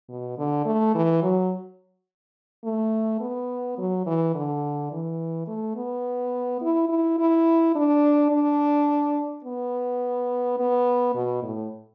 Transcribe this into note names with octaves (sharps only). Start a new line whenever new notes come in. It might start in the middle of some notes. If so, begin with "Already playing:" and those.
B2
D3
A3
E3
F#3
A3
B3
F#3
E3
D3
E3
A3
B3
E4
E4
E4
D4
D4
B3
B3
B2
A2